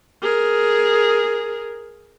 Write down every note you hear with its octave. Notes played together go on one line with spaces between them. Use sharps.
G#4 A#4